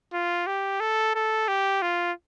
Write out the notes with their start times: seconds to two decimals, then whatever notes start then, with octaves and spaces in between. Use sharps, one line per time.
0.13 F4
0.47 G4
0.81 A4
1.15 A4
1.48 G4
1.82 F4